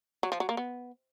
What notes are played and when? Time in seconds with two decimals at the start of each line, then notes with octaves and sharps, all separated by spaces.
0.23 F#3
0.32 F3
0.40 F#3
0.49 A#3
0.57 B3